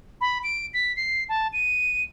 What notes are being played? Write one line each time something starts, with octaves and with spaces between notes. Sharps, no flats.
B5
D7
B6
C7
A5
D#7